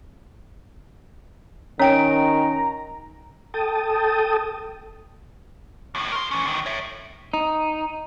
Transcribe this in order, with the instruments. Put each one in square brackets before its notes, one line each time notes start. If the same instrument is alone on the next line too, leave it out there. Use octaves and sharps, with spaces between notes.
[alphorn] D#3 [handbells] C#4 D7 [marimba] C#5 G5 [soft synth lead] A#5
[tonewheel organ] A4 G5 A5 D#6
[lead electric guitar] D#2 A2
A#4 C6
E3 C#4
D2 D#3
C#5 E5
[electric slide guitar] D#4